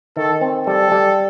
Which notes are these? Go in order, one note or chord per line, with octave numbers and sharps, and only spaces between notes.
D#3 A4
C4
G3 A4
G3